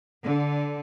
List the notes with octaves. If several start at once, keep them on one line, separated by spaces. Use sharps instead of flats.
D3